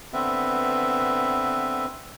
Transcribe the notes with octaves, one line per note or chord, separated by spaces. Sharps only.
D3 B3 C4 B4 E5